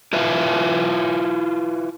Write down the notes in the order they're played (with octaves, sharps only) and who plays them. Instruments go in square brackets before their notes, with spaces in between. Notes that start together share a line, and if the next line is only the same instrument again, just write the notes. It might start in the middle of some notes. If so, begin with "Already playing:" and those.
[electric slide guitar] E4 F4 B4 E5 F5